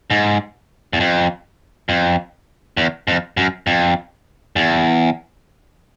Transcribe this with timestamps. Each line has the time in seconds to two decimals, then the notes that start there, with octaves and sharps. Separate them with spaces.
0.10 G#2
0.93 E2
1.00 F2
1.89 F2
2.77 E2
3.07 F2
3.37 F#2
3.67 F2
4.56 E2